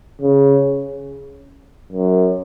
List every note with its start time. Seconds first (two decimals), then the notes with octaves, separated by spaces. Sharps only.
0.22 C#3
1.92 F#2